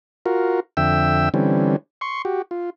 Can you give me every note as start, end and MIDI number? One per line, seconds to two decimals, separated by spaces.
0.26 0.60 65
0.26 0.60 66
0.26 0.60 70
0.77 1.29 41
0.77 1.29 50
0.77 1.29 76
0.77 1.29 79
0.77 1.29 88
1.34 1.76 50
1.34 1.76 52
1.34 1.76 55
1.34 1.76 60
1.34 1.76 61
2.01 2.22 84
2.01 2.22 85
2.25 2.42 66
2.25 2.42 67
2.51 2.70 65